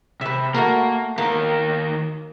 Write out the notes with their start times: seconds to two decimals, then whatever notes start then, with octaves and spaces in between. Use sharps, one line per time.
0.21 C3 B4 E5
0.54 A3 A#3 F#4 A#4
1.18 D#2 A#3 A#4